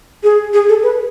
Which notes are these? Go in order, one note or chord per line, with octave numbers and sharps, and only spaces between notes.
G#4
G#4
A4
B4